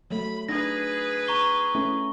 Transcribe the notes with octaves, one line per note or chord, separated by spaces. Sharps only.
F#3 A3 B5
D4 D#4 G#4 B4 A#6
A#5 C#6 G7
A3 C#4 E4